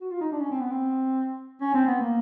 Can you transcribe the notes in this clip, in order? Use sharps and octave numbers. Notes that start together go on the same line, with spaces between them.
F#4
F4
D#4
D4
C#4
C4
B3
C4
C#4
C4
B3
A#3